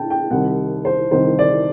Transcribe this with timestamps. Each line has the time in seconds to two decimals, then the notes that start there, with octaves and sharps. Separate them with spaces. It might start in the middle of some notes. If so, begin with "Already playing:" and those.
Already playing: D3 G5 A5
0.10 G5
0.31 C2 C3 D#3 F#5
0.85 C5
1.11 C2 C3 D#3 C5
1.39 D5